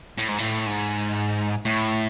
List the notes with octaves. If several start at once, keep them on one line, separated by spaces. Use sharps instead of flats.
A2
G#2
A2
G#2
A2